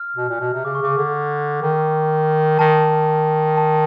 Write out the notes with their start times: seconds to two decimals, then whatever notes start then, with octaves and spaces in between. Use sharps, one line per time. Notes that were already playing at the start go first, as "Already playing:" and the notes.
Already playing: F6
0.16 B2
0.29 A#2
0.40 B2
0.53 C3
0.64 C#3 D6
0.75 C#6
0.81 C#3 D6
0.97 D3
1.62 D#3
2.59 D#3 A5
3.57 A5